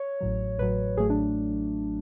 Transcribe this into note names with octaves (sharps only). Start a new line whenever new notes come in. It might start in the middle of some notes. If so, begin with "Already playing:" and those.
Already playing: C#5
A1 A2 F#3
A1 A2 F#3 B4
A1 A2 F#3 A3 G#4
D4